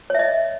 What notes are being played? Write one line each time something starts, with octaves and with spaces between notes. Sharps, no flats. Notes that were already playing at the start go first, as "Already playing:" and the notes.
C#5 D#5 E5